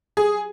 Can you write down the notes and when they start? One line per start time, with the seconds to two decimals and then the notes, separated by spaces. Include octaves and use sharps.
0.17 G#4